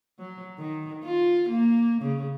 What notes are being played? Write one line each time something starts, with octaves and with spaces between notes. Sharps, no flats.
F#3
D#3
F4
A#3
C#3